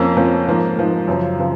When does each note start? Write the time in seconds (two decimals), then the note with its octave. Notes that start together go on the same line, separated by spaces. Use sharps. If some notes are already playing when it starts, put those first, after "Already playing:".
Already playing: F2 F3 A#3 C#4
0.16 F2 F3 A#3 C#4
0.47 G#2 F3 A#3
0.77 G#2 F3 A#3
1.07 F#2 C#3 F3
1.39 C#3 F3